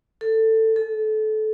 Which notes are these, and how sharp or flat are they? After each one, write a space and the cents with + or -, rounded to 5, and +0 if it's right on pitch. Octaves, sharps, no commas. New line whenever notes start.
A4 +15
A4 -25